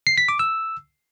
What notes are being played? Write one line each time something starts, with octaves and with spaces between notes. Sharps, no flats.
C7
B6
D6
E6